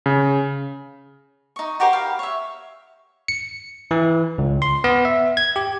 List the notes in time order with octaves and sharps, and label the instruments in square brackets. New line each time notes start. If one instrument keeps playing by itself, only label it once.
[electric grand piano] C#3
[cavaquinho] D#4 C#6
F#4 G4 A#4 C5
F5 B5
C#5 E5
[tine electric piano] C#7
E3
C#2
C6
B3
E5
G#6
G4